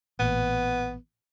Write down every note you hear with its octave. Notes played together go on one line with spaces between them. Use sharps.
A1 A#2 B3